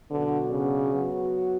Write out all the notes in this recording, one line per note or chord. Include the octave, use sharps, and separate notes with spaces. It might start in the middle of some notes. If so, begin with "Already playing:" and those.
B2 D3 F#3 B3 D4 F#4
C#3
F#3 B3 F#4